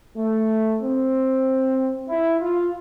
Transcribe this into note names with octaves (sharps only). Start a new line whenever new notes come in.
A3
C4
E4
F4